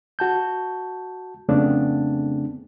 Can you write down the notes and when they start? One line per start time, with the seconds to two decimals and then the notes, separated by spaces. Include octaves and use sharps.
0.19 F#4 A5 G6
1.49 F2 C#3 A3 B3 C4 D4